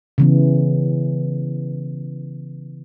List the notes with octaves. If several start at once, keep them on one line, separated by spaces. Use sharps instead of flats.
C#3 E3 B3